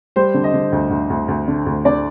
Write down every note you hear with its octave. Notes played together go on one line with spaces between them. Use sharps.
G3 C5
D3
D#5
D3
D2
D2
D2
D2
D3
D2
D3 D5